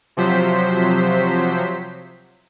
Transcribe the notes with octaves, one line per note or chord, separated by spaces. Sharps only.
C3 F3 F#3 C5 B6